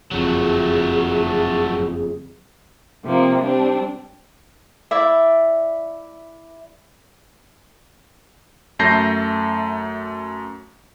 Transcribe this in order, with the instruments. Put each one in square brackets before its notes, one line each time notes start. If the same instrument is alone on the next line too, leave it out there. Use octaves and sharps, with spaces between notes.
[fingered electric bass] F#1 F2 [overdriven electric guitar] F#3 A3 [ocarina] G#4
[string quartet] C3 F3 A#3 C4
G3 C4 D4
[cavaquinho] E4 D5 E5
[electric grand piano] F#2 A3 A5 G6 A#6 C7